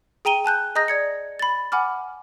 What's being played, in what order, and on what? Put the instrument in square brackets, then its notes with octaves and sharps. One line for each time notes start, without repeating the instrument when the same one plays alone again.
[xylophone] G#4 G5 A#5 D#7 G7
G#5 A5 F#6 G6
G#4 D#5 A#5 D#6 G6 A#6
D5 G#6 C#7
B5 A6
F#5 G#5 B5 D6 F6